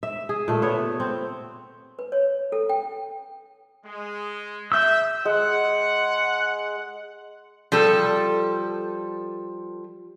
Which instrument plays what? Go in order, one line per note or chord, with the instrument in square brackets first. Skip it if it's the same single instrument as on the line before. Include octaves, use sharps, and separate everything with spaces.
[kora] E5
G#4
A#2 A3
B3 C#5 E5
C4
[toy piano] B4
C#5
A4
G5
[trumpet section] G#3
[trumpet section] E5 [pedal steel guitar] E6 G6
[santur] G#3 [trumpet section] F#5
[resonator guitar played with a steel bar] F3 G3 A4